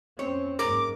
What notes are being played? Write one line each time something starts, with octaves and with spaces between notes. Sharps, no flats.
F2 C4 C#4 C#5
F#1 G#2 A#4 D6